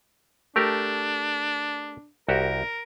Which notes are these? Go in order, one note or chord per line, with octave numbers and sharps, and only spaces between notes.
A3 D4 G4 A#4
C2 F#4 G4 A#4